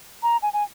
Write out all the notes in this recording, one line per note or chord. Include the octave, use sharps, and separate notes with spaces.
A#5
G#5
G#5